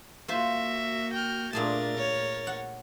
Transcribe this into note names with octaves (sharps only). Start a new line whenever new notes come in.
A#3 F4 F#4 C5 E5
G5 F6
A#2 A3 D4 G#4 A#4 A5 A6
C#5
F#5